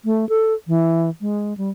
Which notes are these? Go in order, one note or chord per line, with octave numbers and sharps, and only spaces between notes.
A3
A4
E3
G#3
G3